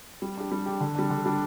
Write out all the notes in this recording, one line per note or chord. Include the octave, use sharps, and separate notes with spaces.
G3
D4 G4
G3
D4 G4
D3
G3 D4
D3
G3 D4